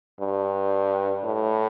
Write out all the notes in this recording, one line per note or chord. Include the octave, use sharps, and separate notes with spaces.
G2
A2